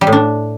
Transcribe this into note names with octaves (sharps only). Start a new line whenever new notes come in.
G3
A2
D4